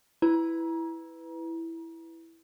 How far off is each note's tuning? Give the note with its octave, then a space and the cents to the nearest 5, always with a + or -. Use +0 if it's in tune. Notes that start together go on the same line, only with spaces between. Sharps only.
E4 +0 B4 +10 A#5 +30